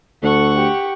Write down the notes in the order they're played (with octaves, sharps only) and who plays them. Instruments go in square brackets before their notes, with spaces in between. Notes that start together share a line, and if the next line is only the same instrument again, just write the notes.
[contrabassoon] D2 [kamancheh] A4 [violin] F#5 C#6
[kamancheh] G4